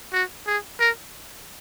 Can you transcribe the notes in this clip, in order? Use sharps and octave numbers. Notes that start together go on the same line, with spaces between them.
F#4
G#4
A#4